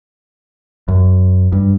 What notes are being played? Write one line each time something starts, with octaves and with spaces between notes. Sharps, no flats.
F#2
G2